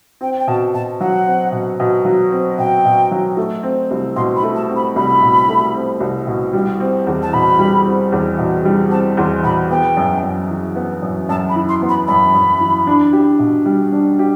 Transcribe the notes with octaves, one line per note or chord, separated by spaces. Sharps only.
C4 G5
G5
B2 A5
B2 A5
F#3 F#5
C4
B2
B2
F#3
C4
B2 G5
B2
F#3
A3
C4
C2
B2 C6
B5
A3
A5
C4
B5
C2 B5
B2
A3
C4
C2
B2
G3
C4
E2
A5
B2 B5
G3
C4
E2
B2
G3
C4 A5
E2 C6
B2 B5
B3 G5
F#2
F#2
E3
B3
F#2
F#2 A5
B5
E3
C6
B3
B5
F#2 B5
F#2
E3
D4
G4
B2
G3
D4
G4